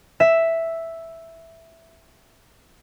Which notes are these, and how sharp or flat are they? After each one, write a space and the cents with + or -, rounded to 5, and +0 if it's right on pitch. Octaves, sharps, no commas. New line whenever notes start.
E5 +0